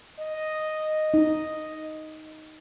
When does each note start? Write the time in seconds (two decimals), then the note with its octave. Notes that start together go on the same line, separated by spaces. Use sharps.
0.19 D#5
1.14 D#4